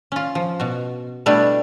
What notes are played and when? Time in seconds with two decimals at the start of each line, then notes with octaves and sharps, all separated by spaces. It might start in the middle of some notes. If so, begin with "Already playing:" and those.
0.12 C#4 F4
0.35 F3
0.60 B2 F#4
1.26 B2 G3 A3 D4 E4 G4